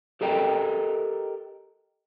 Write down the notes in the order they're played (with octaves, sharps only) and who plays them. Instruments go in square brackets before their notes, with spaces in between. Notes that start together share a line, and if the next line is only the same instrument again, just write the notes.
[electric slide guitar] G4 A4 A#4 D#5 G5